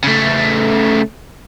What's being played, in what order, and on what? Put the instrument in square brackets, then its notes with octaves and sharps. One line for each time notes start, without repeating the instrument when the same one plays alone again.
[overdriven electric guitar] C#3 A3